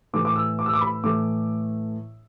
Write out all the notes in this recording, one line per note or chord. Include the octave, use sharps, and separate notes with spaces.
A2 E3 A3 D6
D6
E6
D6
E6
D6
B5
A2 E3 A3 D6